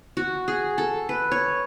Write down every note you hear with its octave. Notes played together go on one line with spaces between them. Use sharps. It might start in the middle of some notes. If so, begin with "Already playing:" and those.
F#4
G#4
A4
B4
C#5